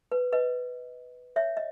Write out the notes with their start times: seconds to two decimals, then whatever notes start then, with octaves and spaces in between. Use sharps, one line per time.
0.12 B4
0.32 B4 D#5
1.36 C#5 E5
1.57 D#5